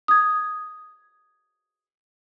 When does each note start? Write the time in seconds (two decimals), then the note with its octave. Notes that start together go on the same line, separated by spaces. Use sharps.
0.08 D#6 G#6